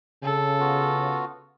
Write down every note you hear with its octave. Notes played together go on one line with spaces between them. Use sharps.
C#3 A4
B3 F4 F#4